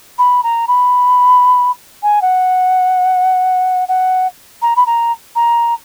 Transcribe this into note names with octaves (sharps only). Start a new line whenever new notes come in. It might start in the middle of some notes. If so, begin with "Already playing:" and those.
B5
A#5
B5
G#5
F#5
F#5
A#5
B5
A#5
A#5